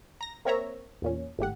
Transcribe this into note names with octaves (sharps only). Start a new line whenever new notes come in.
A#5 A#6
A#3 C4 A#4 C#5 E5 A#5
E2 A#2 C#4
G#1 A2 G4 F#5